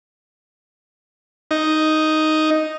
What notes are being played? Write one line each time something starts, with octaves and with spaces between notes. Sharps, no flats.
D#4